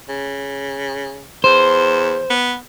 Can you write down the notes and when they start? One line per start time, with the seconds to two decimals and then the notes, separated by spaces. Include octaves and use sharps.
0.09 C#3
1.44 E2 C5
2.30 B3